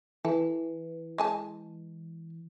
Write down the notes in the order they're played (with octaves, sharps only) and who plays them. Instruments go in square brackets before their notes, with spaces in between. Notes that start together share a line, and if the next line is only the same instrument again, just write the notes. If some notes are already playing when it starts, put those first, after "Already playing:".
[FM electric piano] E3 [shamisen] A4
[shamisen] G#3 G#5 A5